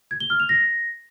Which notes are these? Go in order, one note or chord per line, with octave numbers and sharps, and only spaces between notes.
G#6
G7
F6
F7
A#6